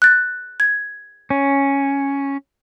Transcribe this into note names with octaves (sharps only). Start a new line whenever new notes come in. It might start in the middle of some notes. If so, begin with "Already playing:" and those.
F#6 A6
G#6
C#4